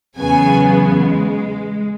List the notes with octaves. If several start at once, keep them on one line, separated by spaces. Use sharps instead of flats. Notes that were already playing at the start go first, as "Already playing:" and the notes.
E2 C#3 F#3 B3 G#5
G#3